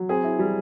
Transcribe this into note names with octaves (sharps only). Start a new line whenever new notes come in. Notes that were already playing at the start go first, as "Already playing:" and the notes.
Already playing: F#3
C4 G#4
E4
G3